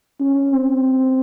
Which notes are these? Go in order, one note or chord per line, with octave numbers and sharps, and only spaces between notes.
C#4
C4